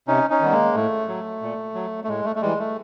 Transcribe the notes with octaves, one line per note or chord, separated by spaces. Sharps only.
C3 C#4 D#4
C#4 D#4
D#3 G3 B3
G#3 A#3
A2 A3
F#3
A#2
F#3
A3
A2 G#3
A3
A3
E3 G3 G#3
A3